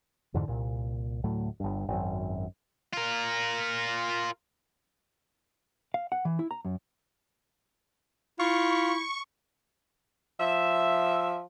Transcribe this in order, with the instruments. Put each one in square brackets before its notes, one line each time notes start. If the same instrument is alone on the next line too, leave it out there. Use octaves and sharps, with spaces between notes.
[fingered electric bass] F2 G#2 D3 E3
C2 A#2
D2 A2 F#3 A3
G1 G2
G#1 F#2
[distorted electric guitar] F4 A#4
[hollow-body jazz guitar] F5
F#5
E3
E4
A#5
F#2
[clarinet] E4 [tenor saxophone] F4 [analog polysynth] C#6
[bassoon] F3 [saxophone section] E5